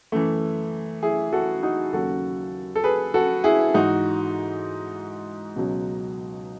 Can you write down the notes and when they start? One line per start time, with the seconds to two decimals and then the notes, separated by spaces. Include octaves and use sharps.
0.12 F#2 E3 A3
1.03 E4 G#4
1.33 F#4 A4
1.63 D#4 F#4
1.93 D#2 C#3 F#3 F#4 A4
2.76 A4
2.84 G#4 B4
3.14 F#4 A4
3.44 E4 G#4
3.74 G#2 E3 D#4 F#4
5.56 C#2 B2 F#3